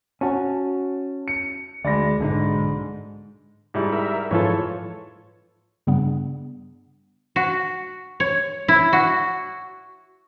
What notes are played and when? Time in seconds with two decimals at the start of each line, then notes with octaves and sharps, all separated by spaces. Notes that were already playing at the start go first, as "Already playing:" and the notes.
0.21 C#4 F#4 A5
1.28 C#7
1.85 D2 G#3 D5 B5 A#6
2.20 B1 G#2 D3 D#4
3.74 G#2 G3 E4
3.92 A#4 E5
4.31 G#2 E3 F3 F4 A4 C#5
5.87 G2 C#3 G3 B3 D4
7.36 F#4
8.20 C#5
8.68 E4
8.93 F#4